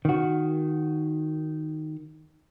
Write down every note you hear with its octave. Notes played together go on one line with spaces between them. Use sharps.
D#3 F#4